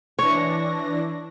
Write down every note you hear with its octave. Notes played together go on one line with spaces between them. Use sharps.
E3 D4 C#5 A#6